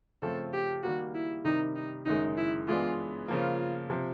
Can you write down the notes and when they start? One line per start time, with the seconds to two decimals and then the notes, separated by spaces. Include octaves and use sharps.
0.22 C#3 F3 A3 C4 A4
0.53 G4
0.83 D#3 G3 A#3 F#4
1.15 E4
1.45 C3 D#3 G3 D#4
1.76 D#4
2.06 F#1 F#2 D#3 G#3 D#4
2.37 E4
2.68 E3 G#3 B3 D4 F4
3.28 C#3 F3 A#3 F4
3.90 C3 F3